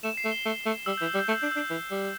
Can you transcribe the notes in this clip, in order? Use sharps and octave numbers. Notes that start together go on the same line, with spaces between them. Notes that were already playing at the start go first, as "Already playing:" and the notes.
A3 E7
C7
A3
G7
A3
A3
G3 E6
E3 G6
E6
G3
G6
A3 E6
D4 G6
D4 E6
E3
G3